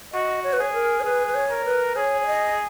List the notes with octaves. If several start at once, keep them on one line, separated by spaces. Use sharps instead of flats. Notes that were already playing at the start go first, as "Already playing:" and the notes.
F#4 D#5
C#5
B4
G#4 C#5
A#4
C#5
G#4 B4
B4
C#5
A#4
B4
G#4 C#5
C#5
D#5